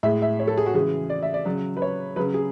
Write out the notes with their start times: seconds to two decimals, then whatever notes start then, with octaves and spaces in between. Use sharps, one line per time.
0.03 A2 G#3 E5
0.22 E5
0.40 C#5
0.47 A4
0.58 G#4
0.66 F#4
0.74 C#3 E3 G#3 G#4
1.10 D5
1.22 E5
1.34 D5
1.45 C#3 F#3
1.77 B4
1.82 C#5
2.16 C#3 F#3 B4
2.34 G#4